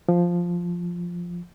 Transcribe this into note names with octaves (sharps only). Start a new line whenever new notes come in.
F3